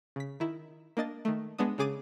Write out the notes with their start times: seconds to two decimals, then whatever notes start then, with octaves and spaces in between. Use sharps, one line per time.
0.16 C#3 B6
0.40 D#3 E4
0.97 A#3 D4 D#5 A6
1.25 D#3 A3
1.58 G#3 B3 D4 D#6
1.78 C#3 C#4 G#4 D6 A6 D#7